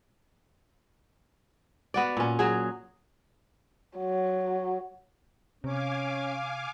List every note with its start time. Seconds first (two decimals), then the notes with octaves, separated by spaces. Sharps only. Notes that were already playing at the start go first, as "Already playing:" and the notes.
1.94 B3 F#4 D5
2.17 A#2 C#4
2.39 F#3 G#4
3.98 F#3
5.64 C3 C#4 F5 G#5 D6